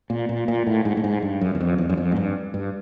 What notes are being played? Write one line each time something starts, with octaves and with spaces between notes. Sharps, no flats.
A#2
A#2
A#2
A2
G#2
A2
G#2
G2
F#2
E2
F2
E2
F#2
F2
G#2
G2
G2